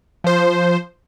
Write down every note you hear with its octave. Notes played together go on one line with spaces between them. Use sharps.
F3 C5